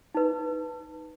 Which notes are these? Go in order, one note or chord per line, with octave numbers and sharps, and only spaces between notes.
D#4 B4